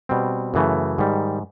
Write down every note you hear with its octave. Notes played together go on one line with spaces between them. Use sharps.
B2 G3 C4
F#2 C#3 E3 A3
G#2 D#3 G3